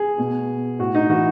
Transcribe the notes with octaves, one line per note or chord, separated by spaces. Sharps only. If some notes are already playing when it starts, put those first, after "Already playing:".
Already playing: G#4
B2
A2 F#4
D#4
E3 F#4